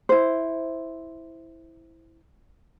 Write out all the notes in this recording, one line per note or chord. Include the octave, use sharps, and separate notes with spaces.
E4 C5